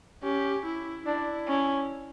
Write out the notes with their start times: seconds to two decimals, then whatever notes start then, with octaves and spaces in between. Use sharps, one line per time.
0.23 C#4 G4
0.65 E4
1.06 D4 E4
1.47 C#4